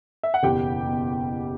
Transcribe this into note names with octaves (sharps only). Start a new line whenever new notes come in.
E5
F#5
F#1 E2 B2 G4 G5
B2